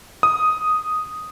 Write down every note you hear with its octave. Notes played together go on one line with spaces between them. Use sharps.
D#6